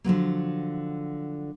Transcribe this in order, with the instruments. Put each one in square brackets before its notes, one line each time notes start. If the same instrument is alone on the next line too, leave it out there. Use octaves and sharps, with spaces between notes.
[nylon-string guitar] D3 F3 F#3 A#3